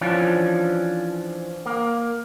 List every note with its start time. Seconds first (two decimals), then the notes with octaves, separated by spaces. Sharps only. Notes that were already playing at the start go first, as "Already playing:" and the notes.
0.01 E3 F3 C#4 D4 F4
1.66 A#3